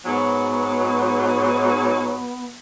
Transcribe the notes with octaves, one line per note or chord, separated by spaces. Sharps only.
G#2 F#3 B3